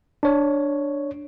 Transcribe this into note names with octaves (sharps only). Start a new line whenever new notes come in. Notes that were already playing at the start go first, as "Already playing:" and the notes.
D4 C#5